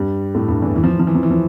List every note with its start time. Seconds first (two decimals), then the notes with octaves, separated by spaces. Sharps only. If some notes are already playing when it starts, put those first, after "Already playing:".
Already playing: G2 G3
0.35 A2 A3
0.48 G2 G3
0.62 E2 E3
0.76 E3
0.84 F3
0.91 E3
0.99 F3
1.07 E3
1.15 F3
1.23 E3
1.31 F3